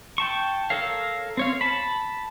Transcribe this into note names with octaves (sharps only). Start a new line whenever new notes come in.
G5 A5 C#6
A4 A#4 C#5 F5
C4 C#5 F5
A5 B5